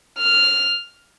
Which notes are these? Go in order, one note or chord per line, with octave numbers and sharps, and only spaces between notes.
F6